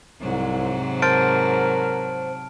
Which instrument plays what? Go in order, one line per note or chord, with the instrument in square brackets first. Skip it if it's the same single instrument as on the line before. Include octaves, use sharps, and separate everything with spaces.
[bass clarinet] C2 [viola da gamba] G#2 C3 F#3
[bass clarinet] A#4 [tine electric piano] C5 A6 [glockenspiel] A5 F6 D7